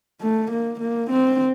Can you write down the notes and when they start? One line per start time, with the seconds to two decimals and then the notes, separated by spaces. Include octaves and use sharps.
0.21 A3
0.51 A#3
0.80 A#3
1.10 C4